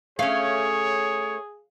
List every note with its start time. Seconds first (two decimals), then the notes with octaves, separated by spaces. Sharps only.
0.19 A3 C#4 G#4 C#5 F5